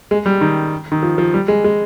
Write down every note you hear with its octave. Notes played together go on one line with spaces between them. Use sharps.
G#3
G3
D#3
D#3
F3
F3
G3
G#3
G#3